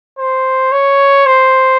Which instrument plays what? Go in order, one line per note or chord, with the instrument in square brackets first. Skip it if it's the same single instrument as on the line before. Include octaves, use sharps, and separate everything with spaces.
[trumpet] C5
C#5
C5